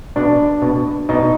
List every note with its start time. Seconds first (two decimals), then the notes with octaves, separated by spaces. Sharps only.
0.16 B2 D4
0.62 B2
1.09 B2 D#4